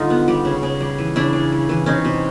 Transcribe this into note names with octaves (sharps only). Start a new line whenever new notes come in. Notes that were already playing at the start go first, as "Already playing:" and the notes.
Already playing: D3 G3 D#4 F4
B3
G3
C#3
C#3
G3
E3
C#3 D4 E4
C#3
G3
E3
C3 C#4 D#4
C3